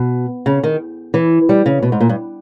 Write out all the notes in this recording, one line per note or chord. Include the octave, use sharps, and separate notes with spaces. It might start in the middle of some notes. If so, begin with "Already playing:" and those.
Already playing: B2
C#3
D#3
E3
G3
C#3
B2
G#2
A#2
G2